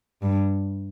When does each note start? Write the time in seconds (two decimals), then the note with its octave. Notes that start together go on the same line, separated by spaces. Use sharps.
0.22 G2